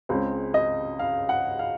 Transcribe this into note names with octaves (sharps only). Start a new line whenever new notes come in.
C#2 C#3 G#3 C4
D#5
F5
F#5
F5